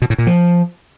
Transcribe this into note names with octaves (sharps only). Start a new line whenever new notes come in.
B2
A2
A#2
F3